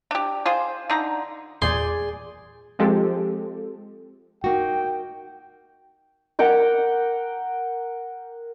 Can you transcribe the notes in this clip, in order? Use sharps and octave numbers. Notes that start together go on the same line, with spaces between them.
D4 G4
F4 G#4 C5
D3 D#4 A#5
E2 A#2 G#4 D5 G#5 C6 G6
F3 G#3 C4 G4 A4
A#3 D#4 F#4 G5
A#4 F#5 G5 D6